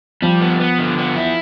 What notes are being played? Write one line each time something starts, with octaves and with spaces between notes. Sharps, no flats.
F3 G3
B3
B3
D3
B3
E4